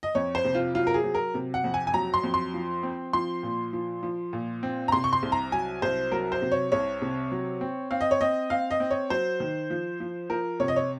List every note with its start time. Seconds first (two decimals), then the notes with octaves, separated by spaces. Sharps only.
0.03 D#5
0.15 F2 C#5
0.35 C5
0.44 C3
0.55 F4
0.74 F#3 F4
0.87 A#4
0.94 G#4
1.04 F#3
1.15 A#4
1.34 C3
1.54 F#5
1.64 F2
1.74 G#5
1.87 G#5
1.94 F#3 A#5
2.14 C6
2.23 F2
2.34 C6
2.54 F3
2.83 C4
3.13 F3 C6
3.43 A#2
3.73 F3
4.03 F3
4.33 A#2
4.63 C4
4.88 A#5
4.92 C3 C6
5.04 C#6
5.13 C6
5.23 C2
5.32 A#5
5.52 F#3 G#5
5.82 C2 C5
6.12 F#3 A#4
6.32 C5
6.42 C3
6.52 C#5
6.72 C2 C#5
7.01 C3
7.32 F#3
7.61 C4
7.91 C4 F5
8.01 D#5
8.11 C#5
8.21 C4 D#5
8.50 C4 F5
8.71 D#5
8.80 C4
8.91 C#5
9.10 F#3 C5
9.40 D#3
9.70 F3
10.00 F3
10.30 F3 A#4
10.60 C3 C#5
10.68 D#5
10.76 C#5